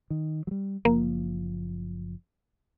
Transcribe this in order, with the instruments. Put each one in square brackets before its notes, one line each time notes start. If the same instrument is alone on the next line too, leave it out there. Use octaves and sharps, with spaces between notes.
[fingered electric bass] D#3
F#3 G3
[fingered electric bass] F#1 F3 [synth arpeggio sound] A#3